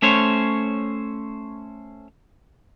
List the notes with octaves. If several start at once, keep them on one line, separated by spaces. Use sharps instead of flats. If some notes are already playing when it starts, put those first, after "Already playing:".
A3 C#4 C5 C#5